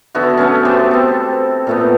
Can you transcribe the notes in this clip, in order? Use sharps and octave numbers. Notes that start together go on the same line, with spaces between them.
D3 B3 E4 F#4
A3 B3 C#4
B3 G4 C5
C4 A4
A#2 A3 B3